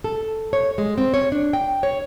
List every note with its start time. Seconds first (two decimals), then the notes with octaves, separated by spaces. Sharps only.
0.04 A4
0.53 C#5
0.78 G#3
0.98 C4
1.14 C#5
1.32 D4
1.53 G5
1.83 C#5